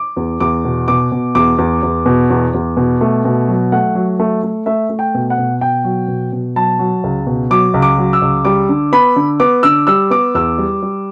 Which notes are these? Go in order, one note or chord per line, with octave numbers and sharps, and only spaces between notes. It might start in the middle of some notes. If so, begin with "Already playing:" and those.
Already playing: D6
E2
E2 D6
B2
B2 D6
B2
E2 D6
E2
E2
B2
E2
E2
B2
A3
B2
F#3
A3 F#5
F#3
A3
A3
A3 E5
A3
G5
B2
F#5
B2
B2 G5
F#3
B2
B2
F#3 A5
F#3
C#2
B2
F#3 D6
C#2
D6
F#3
E6
C#2
G3 D6
D3
B3 B5
D3
B3 D6
D3 E6
G3 E6
B3 D6
E2 E6
G3
G3